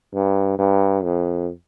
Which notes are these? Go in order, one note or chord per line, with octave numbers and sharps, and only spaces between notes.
G2
G2
F2